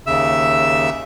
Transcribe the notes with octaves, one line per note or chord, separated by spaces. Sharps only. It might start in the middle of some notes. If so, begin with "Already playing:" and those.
D#2 C#3 E5 E6